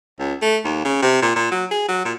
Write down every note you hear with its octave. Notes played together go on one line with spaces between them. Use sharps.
C#2
A3
D#2
C#3
C3
A#2
A#2
F#3
G#4
F#3
A#2